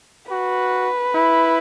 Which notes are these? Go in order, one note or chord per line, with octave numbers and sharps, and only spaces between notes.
F#4 B4
E4